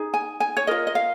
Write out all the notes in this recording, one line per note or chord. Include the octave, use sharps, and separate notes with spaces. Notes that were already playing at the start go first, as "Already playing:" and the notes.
Already playing: D#4 G#4
G#5
G#5
C#5
F4 A#4 D#5
D#5
F5